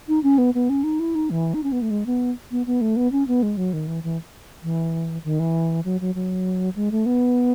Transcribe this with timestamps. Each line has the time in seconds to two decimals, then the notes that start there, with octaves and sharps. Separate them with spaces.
0.08 D#4
0.23 C#4
0.38 B3
0.54 B3
0.70 C#4
0.84 D#4
1.00 E4
1.15 D#4
1.30 E3
1.54 D#4
1.63 C#4
1.72 B3
1.82 A3
1.90 G#3
2.06 B3
2.51 B3
2.66 B3
2.81 A3
2.96 B3
3.12 C#4
3.28 B3
3.43 G#3
3.57 F#3
3.73 D#3
3.87 E3
4.04 E3
4.63 E3
5.24 D#3
5.40 E3
5.85 F#3
6.01 F#3
6.15 F#3
6.76 G#3
6.91 A3
7.06 B3